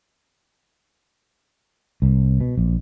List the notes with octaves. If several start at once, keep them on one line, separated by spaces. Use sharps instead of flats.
C2
B2
A#1